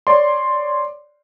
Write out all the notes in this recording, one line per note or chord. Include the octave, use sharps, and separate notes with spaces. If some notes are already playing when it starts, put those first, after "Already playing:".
C#5 D5 C6